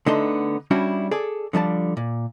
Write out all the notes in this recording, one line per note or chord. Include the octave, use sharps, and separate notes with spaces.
D3 A3 B3 D#4 A4 C6
G3 C#4 D4 E4 F#4
G#4 A4 D5
D3 F3 G3 A5
A#2